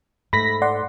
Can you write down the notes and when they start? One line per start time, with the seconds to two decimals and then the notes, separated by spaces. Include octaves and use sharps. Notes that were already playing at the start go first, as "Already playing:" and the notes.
0.33 G#2 A3 B5 A#6 B6
0.62 D5 F#5 C6